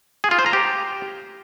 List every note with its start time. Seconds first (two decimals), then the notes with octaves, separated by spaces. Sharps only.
0.24 G#4
0.31 F4
0.39 C5
0.46 A#5
0.53 G4